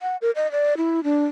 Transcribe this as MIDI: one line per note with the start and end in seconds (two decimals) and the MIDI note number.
0.02 0.17 78
0.22 0.31 70
0.36 0.50 75
0.52 0.77 74
0.77 1.04 64
1.04 1.26 62